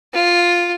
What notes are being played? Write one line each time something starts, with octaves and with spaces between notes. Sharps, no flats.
F4